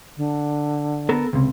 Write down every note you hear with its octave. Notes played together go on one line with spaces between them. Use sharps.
D3
B3 A4 A#4
C#2 C3